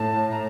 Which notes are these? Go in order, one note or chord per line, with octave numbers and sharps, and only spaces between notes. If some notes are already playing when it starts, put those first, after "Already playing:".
Already playing: A2 A5
A#5